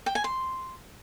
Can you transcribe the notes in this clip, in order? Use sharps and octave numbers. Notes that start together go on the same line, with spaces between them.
G5
G#5
C6